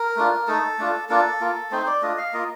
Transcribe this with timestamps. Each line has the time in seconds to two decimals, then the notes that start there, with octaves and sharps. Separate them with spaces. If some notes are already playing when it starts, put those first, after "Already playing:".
Already playing: A#4
0.16 A3 D4 F4
0.47 A3 D#4 A4
0.78 A3 D4 F4
1.09 A#3 D4 F4 A4
1.41 A#3 F4
1.71 A3 C4 D#4 C5
1.87 D5
2.02 A3 D4 F4 D#5
2.18 F5
2.33 A#3 F4 D#5